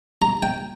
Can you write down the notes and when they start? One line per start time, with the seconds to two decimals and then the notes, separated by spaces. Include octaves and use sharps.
0.22 A#5
0.43 G5